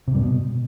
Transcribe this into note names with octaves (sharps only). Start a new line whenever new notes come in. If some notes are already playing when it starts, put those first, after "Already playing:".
C3
G2
B2